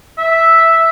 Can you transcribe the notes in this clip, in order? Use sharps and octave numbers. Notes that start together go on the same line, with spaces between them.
E5